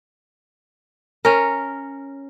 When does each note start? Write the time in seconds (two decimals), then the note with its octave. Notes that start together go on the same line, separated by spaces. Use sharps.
1.25 C#4 A#4